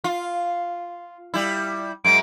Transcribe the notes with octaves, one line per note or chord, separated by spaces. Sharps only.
F4
G3 E4
F#2 G#3 D7